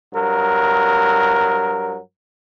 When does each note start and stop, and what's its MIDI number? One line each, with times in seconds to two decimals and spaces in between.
0.14 1.99 43
0.14 1.99 54
0.14 1.99 70